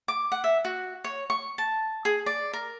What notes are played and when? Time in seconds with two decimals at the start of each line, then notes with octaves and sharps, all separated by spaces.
0.08 D6
0.32 F#5
0.44 E5
0.65 F#4
1.04 C#5
1.30 C#6
1.58 A5
2.05 G#4
2.26 D5
2.53 A#4